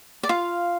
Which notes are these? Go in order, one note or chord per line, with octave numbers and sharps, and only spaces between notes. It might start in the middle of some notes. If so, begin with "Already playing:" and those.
D5
F4 F5